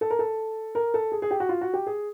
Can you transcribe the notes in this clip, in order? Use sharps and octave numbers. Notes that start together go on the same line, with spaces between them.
A4
A#4
A4
A#4
A4
G#4
G#4
G4
F#4
F4
F#4
G4
G#4